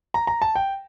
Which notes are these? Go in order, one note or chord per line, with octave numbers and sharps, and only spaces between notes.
A#5
A#5
A5
G5